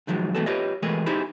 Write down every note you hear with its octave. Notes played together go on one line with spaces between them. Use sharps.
F#2 D#3 F3 F#3 G#3
E3 G#3 A3 B3 F#4 A4
F4 G4 B4 C#5 D#5
E3 G#3 A3 G#4 A#4 B4
D#4 E4 G4 G#4 C5 B5